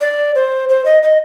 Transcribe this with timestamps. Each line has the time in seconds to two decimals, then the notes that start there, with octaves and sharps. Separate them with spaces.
0.01 D5
0.35 C5
0.69 C5
0.85 D#5
1.03 D#5